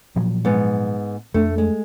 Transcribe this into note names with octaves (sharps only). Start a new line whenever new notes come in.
A#2 F3 F#3
G#2 B3
F2 A3 D4
G#3